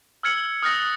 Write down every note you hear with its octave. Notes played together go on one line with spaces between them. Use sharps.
E6 F6 G#6 C#7 F#7
D#6 F6 F#6 A6 A#6 C#7